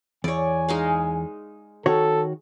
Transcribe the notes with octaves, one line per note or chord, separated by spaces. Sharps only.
E2 C#5 D5 G#5
G#3 D#4 F5
D#3 F#4 A4 C#5